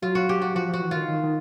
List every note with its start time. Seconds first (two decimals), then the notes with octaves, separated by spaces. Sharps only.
0.02 F#3 F4
0.15 F#4
0.29 G4
0.42 F#4
0.55 F3 F#4
0.68 F3
0.73 F#4
0.81 E3
0.91 D#3 F4
1.08 D#3
1.23 D#3